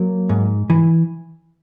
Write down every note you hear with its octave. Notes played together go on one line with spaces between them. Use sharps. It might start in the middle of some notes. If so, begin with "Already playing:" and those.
Already playing: F#3 A#3
G#2
E3